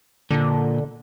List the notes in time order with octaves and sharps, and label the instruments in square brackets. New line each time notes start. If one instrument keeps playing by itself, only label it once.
[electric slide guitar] A#2 [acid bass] D3